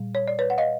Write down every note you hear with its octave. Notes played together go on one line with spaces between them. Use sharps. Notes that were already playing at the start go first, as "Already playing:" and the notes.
Already playing: A#2 G3
C#5
D5
B4 C#5
F#5
D#5 F5